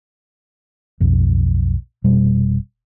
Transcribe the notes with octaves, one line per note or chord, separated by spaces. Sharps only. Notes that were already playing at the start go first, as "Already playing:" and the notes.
B1 F2
F1 B2 G3 C#4